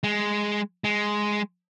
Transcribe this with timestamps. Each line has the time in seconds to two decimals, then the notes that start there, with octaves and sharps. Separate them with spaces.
0.04 G#3
0.84 G#3